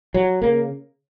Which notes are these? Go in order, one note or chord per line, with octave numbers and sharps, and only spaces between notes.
F#3
C#3 A#3